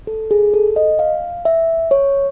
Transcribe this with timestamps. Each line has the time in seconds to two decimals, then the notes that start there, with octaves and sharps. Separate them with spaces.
0.07 A4
0.31 G#4
0.53 A4
0.76 D#5
0.99 F5
1.45 E5
1.91 C#5